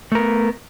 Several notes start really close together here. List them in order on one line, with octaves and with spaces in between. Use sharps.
A3 A#4 B3